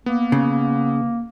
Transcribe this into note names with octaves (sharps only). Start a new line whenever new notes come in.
A#3 B3
C#3